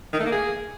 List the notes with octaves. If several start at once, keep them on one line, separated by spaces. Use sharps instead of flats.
D#3
A3
A#3
G#4